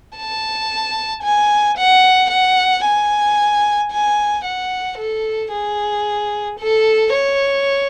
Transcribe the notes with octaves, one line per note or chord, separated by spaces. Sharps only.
A5
G#5
F#5
F#5
G#5
G#5
F#5
A4
G#4
A4
C#5